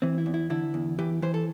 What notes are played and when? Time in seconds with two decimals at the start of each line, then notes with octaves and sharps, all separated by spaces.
0.02 E3 C4
0.18 E4
0.26 E2
0.34 E4
0.50 D3 E4
0.74 E2
0.99 E3 G4
1.22 E3 C5
1.34 A4